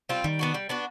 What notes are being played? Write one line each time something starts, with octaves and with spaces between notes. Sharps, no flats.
G3 C4 F4
D#3 G3
B3 D4 F#4
G3
B3 D4 F#4